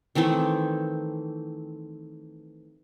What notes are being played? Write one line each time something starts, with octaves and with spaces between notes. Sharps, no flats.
D#3 E3 A3 C4